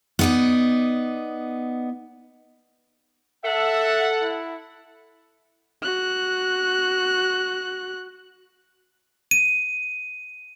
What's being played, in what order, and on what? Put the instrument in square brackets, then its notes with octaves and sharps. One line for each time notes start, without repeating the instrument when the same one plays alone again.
[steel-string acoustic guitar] B3 D#4 D5
[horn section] A4 F#5 [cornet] E5
[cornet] E4
[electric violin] F#4 F#6
[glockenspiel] D#7